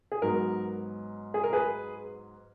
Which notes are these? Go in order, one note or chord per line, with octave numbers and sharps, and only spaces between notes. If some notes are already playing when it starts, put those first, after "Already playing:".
G#4
G#2 F#3 B3 A#4
G#4
A#4
G#4 B4